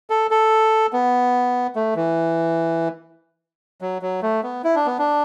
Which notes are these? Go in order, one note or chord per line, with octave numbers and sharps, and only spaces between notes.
A4
A4
B3
A3
E3
F#3
F#3
A3
B3
E4
D4
B3
D4